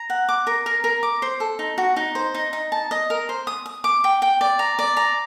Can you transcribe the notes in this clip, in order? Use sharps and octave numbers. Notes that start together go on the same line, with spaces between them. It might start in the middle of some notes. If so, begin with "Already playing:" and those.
Already playing: A#5
F#5
D6
A#4
A#4
A#4
D6
C5
A4
D#4
F#4
D#4
C5
D#4
D#4
A5
D#5
A#4
C5
D#6
D#6
D6
G5
G5
D5
A#5
D5
A#5